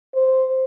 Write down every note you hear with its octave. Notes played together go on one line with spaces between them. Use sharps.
C5